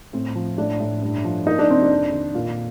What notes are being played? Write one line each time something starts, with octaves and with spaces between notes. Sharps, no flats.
A2 C4
F3
A2 D4
A2
G2
F3
A#3 D#4
D4
C3 C4
D4
F2
D#3
A#2 F4